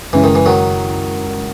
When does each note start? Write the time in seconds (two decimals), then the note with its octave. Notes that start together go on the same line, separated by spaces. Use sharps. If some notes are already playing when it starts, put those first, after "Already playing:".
0.13 F#2 C#3 E3 G#3 C#4 E4
0.24 D#3
0.35 E3
0.46 D#3 F#3